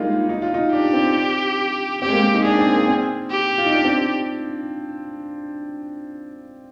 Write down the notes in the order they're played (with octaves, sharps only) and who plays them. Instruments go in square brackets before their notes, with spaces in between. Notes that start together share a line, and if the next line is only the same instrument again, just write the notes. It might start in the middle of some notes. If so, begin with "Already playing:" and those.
Already playing: [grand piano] G3 G#3 A#3 D#4 F4
D#4
F4
D#4
[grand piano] D4 [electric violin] G4
[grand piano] C4
[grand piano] C4 [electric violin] G4
[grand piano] G#3
A#3
C4
D#4
[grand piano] D4 [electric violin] G#4
[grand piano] C4
A#3
C4
[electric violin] G4
[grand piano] F4
D#4
D4
C4